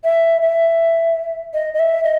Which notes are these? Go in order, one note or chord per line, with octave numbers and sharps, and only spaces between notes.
E5
E5
D#5
D#5
E5
D#5